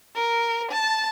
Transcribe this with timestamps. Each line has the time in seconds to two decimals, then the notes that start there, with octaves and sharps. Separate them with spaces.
0.15 A#4
0.72 A5